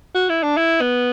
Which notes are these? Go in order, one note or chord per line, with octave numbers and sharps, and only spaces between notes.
F#4
E4
D4
E4
B3